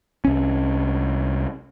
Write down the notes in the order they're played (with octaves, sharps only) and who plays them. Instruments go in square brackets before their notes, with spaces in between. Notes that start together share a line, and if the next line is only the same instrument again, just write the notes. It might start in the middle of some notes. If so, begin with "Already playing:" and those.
[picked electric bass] C2 C#4